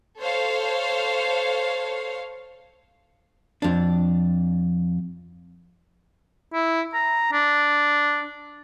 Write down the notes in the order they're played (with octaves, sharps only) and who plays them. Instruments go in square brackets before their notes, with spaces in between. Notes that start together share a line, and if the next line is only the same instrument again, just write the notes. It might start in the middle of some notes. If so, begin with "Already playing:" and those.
[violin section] A4 C5 C#5 F5
[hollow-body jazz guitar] F2 D4
[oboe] E4
A#5
D4